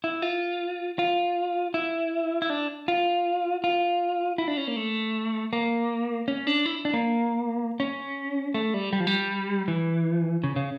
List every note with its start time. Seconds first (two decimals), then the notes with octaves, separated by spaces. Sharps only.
0.04 E4
0.22 F4
0.99 F4
1.74 E4
2.42 E4
2.50 D4
2.88 F4
3.64 F4
4.38 E4
4.48 D4
4.57 C#4
4.68 A#3
4.76 A3
5.53 A#3
6.28 C#4
6.47 D4
6.66 E4
6.85 D4
6.94 A#3
7.80 C#4
8.54 A3
8.74 G3
8.93 G3
9.00 F3
9.07 G3
9.68 E3
10.44 C#3
10.56 C#3